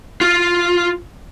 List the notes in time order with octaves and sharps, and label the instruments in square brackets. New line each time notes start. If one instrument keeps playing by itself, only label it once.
[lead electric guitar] F4